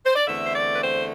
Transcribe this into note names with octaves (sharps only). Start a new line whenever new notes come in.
C5
D5
E2 D3 A3 C4 E5
C5
D5
B4
C5